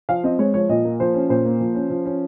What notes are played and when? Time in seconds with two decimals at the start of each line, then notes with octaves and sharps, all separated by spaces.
0.09 F3 F5
0.24 C4 D#5
0.39 G#3 C#5
0.54 F3 C#5
0.69 A#2 D#5
0.85 A#3
1.00 F3 C5
1.15 C#4
1.29 A#2 C5
1.45 A#3
1.60 F3
1.75 C#4
1.90 F3
2.06 C#4